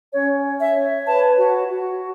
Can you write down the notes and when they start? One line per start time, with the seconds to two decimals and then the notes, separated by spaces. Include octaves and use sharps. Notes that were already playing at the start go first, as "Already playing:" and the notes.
0.14 C#4 C#5
0.44 C#5
0.60 E5
0.76 C#5
1.06 B4 A5
1.38 F#4
1.69 F#4